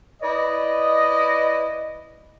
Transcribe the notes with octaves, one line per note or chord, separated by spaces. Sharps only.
E4 B4 D5 D#5